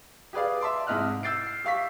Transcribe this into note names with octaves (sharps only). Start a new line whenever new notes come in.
G4 G#4 B4 D5 F5
E5 A5 C6 D6
G#2 C3 E4 D#5 F6 F#6
E6 G6 A6 C7 D7
C7
G4 F5 C#6 B6